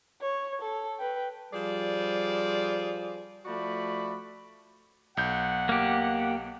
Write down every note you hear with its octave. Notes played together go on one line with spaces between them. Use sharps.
C#5
A4
B4 G5
F3 G3 G#4 C5 D5
F3 A3 F#4 D5 B5
B1 F#5 G6
A#3 G4